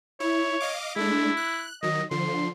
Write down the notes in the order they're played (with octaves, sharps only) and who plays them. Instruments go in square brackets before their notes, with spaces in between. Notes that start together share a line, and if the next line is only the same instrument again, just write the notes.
[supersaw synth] E4 [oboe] C#5
[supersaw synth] D#5 F5 D6
[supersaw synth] G#3 A3 D4 [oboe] E4
[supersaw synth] F#6
[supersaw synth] D#3 F#3 [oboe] D#5
[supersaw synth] D3 F3 [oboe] C6